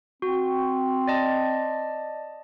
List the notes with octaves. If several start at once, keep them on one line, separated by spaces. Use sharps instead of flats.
C4 F#4
D5 D#5 A5